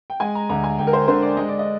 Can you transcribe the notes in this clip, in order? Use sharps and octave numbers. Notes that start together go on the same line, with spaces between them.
G5
G#3 G#5
A#5
D2 A#5
G#5
D2 G5
A#4
C5
D3 C5
D5
G#3 D#5
D5
D#5